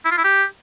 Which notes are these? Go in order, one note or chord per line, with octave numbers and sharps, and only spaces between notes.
E4
F4
E4
G4